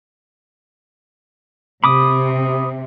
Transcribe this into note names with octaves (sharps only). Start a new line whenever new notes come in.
C3 B5 D6 D#6